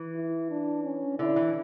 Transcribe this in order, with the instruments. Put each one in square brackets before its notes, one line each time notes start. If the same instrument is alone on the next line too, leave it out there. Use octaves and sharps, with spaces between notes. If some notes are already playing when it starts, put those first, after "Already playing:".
Already playing: [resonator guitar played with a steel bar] E3
[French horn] E4
D4
C#4
[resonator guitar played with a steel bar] D3 [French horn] E4
[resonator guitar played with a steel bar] E3